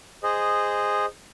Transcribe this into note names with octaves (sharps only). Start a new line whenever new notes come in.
G#4 C5 D#5